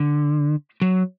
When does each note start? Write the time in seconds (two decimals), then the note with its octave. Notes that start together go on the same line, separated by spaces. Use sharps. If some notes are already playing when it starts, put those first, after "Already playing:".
Already playing: D3
0.82 F#3